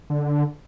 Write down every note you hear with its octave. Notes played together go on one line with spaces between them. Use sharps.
D3